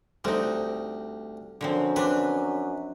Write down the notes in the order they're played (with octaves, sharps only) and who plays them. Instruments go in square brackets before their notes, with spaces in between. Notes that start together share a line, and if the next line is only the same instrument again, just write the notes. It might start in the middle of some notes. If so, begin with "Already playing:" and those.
[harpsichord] D2 G3 [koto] C4 D#4
[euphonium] F#2 [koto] D3 F3 C4
[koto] C4 D4 [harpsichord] B4